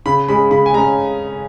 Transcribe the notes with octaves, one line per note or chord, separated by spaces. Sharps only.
C#3 B5
G#3 C#4 B5
C#3 B5
G#5
G#3 C#4 A#5